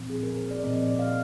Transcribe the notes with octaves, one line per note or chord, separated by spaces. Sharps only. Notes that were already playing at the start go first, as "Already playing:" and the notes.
Already playing: A#2 F3 C4
G#4
A#4
C5
D5
A#2 F3 C4 D#5
D5
F5